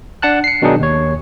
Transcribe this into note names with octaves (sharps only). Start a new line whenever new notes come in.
D4 F#5 A5 F#6
C7 C#7
B2 D#3 F#3 D4 D#4 G#4
D#2 C#5